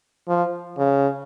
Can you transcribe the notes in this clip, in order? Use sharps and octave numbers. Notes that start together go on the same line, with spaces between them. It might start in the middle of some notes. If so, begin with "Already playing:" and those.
F3
C#3